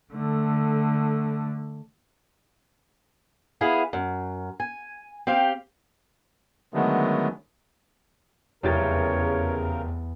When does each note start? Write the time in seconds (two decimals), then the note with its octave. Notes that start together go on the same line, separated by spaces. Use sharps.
0.13 D3 A3
3.61 B3 E4 G#4 F5
3.93 F#2
4.60 G#5
5.27 C4 G4 F5 G5
6.74 D3 D#3 F#3 G#3 A3 B3
8.63 F1 E2 C#3 G4 A#4 C#5 A6